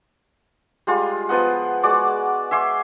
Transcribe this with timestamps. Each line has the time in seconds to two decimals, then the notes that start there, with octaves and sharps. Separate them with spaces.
0.87 G3 G#3 F4
1.29 F3 B3 D#5 F#5
1.83 G#3 F#4 D5 D6
2.51 E5 G#5 C6 D6